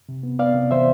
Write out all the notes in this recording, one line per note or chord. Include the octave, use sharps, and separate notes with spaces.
C3
B3
B3 D5 F5
C3
E3 C5 E5